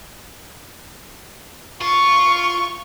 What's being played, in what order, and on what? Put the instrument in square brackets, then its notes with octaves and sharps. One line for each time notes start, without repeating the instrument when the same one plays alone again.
[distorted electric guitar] F4 [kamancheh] C#6